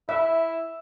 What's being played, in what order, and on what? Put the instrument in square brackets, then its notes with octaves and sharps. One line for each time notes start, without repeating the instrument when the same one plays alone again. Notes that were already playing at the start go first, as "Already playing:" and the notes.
[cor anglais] E4 [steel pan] E5